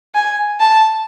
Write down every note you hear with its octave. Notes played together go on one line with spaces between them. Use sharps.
G#5
A5